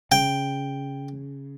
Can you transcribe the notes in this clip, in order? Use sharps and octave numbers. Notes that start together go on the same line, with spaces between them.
C#3 G5